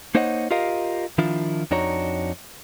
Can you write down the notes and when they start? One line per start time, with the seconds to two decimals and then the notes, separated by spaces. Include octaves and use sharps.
0.15 A#3 D#4 C5 C#5 D#5 F#5
0.51 F4 G4 A#4 D#5 F5
1.18 D#3 F3 D4 E4 F4
1.71 F2 D4 D#4 F#4 C#5 A#5